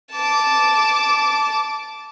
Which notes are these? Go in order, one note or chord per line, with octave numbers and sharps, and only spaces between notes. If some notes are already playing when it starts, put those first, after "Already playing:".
A5 D6